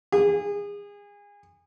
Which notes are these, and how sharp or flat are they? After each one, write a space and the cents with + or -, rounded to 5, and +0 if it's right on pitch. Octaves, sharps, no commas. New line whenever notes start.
G#4 -30